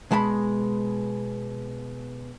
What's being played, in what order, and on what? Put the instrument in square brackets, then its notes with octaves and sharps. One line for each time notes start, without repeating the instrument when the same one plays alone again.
[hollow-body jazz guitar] B2 G#3 A5 B5